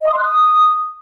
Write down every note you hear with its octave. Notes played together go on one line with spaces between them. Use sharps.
D#5
D#6
C6
F#6
D#6